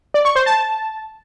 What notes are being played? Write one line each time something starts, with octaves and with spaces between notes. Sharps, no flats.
D5
C#6
C5
A5